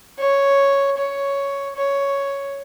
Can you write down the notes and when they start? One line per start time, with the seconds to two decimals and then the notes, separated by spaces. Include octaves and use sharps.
0.19 C#5
0.97 C#5
1.76 C#5